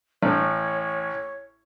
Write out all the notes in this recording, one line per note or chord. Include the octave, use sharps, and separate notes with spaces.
A1 A2 C#5